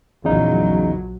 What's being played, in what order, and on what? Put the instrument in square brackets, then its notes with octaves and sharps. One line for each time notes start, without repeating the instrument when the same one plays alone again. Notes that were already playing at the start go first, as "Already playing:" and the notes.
[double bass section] A#1 F#3 [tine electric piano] E2 C#3 D#4